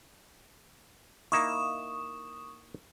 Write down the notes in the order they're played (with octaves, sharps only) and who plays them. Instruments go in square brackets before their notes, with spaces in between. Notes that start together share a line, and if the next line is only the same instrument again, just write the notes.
[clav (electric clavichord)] A#3 D#4 E4 [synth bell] C#6 D#6 E7